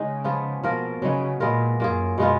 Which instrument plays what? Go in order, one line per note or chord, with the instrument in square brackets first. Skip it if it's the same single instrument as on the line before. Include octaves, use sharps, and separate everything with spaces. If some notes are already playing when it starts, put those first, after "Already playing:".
Already playing: [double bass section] C#3 [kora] G#3 D#4
[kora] F3 B3 F4 G#4
[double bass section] B2 [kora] F3 A#3 F4 A#4
[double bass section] C#3 [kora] F#3 B3 D#4
[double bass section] A#2 [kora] G#3 B3 F4 A#4
[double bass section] F#2 [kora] A#3 F4 G#4
[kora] B2 G#3 B3 F4